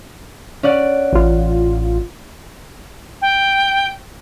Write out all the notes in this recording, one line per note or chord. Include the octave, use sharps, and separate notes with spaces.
C#4 D5 F#5
A1 F4
G5